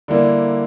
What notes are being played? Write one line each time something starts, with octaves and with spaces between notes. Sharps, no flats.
D3 G3 A#3 E4